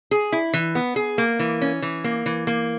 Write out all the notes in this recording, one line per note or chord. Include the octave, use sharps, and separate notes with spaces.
G#4
E4
E3
B3
G#4
A#3
E3
C#4
E3
A#3
E3
A#3